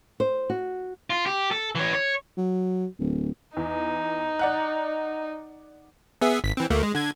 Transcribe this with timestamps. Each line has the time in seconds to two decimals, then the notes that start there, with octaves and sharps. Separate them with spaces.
0.20 C5
0.50 F#4
1.10 F4
1.26 G4
1.51 A4
1.75 E3 C#5
1.94 C#5
2.37 F#3
2.99 D1
3.57 E2 D#4
4.39 D5 F#5 F#6
6.21 B3 G#4 E5
6.44 G#1 B6
6.57 E3 C4
6.70 D2 A3 A#3
6.83 G#3
6.95 D3 G#6